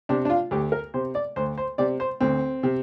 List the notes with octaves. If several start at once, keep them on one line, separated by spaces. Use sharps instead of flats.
C3 D4
D4
F4
D2 G4
A#4
C3 C5
D5
D2 C5
C5
C3 D5
C5
D2 C4
C3